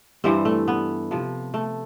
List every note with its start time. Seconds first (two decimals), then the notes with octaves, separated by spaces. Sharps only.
0.24 G2 E3 G3 C4
0.45 A3
0.68 B3
1.11 C3 F3
1.54 A3